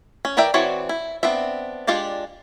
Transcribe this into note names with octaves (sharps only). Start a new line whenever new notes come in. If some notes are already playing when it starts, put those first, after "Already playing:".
C#4
E3 A#4 D5 E5 G5
E3 C4 F#4 C#5 D5
E4
B3 C4 D4 E5
G#3 D4 F4 G4 D5